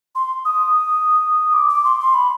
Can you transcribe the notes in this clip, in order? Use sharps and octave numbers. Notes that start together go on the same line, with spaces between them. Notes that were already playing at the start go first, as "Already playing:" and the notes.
C6
D#6
D6
D6
C6
C6
B5